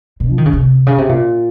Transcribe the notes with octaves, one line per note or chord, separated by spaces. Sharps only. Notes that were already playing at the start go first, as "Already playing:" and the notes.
A#2
F3
D#3
C#3
C3
C#3
C3
A#2